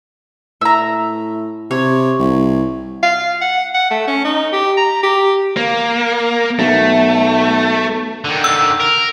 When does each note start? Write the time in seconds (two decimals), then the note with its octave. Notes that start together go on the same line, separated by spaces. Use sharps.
0.61 A2 E5 A#5
1.71 C3 C#5
2.19 C2
3.03 F5
3.41 F#5
3.74 F#5
3.91 A3
4.08 C#4
4.24 D#4
4.52 G4
4.77 A#5
5.03 G4
5.57 A#3
6.59 B1 A3
8.24 D3 D#3
8.44 E6
8.80 A#4